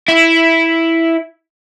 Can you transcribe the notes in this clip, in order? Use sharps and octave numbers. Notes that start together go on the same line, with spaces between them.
E4